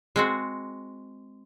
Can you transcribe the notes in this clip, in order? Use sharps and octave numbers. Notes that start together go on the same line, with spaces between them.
G#3 C4 F#4